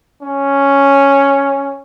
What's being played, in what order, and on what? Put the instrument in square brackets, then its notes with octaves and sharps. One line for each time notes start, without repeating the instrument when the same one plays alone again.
[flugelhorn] C#4